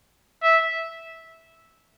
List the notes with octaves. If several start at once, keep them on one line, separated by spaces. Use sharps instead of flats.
E5